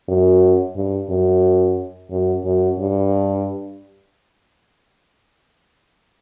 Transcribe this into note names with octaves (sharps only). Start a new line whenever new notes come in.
F#2
G2
F#2
F#2
F#2
G2